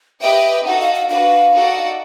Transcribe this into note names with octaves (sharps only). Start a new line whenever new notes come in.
G4 B4 D#5 E5 G5
D#4 F#4 A4 F#5
F5
F5
D4 F#4 B4 F5
D#4 F#4 A4 D5 F#5